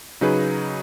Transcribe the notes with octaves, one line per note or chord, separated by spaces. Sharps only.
C#3 F#3 D#4 G#4 B4